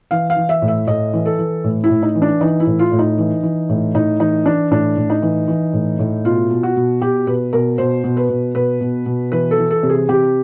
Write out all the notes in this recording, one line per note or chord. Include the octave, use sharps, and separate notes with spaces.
E3 F5
F5
E3
E5
A2
E5
A2 D#5
E3
A4
E3
A2
E4
A2
D#4
E3
D4
E3 D#4
E4
A2
F4
A2
D#4
E3
E3
A2
A2 D#4
E3 D#4
E3 D4
A2 D4
A2
D#4
E3
E3
A2
A2
B2 F4
B2
F#4
B2
B2 G4
B2 B4
B2 A#4
B2 C5
B2
B4
B2
B2 B4
B2
B2
E3 B4
A4
E3
A4
C3
G#4
C3 G4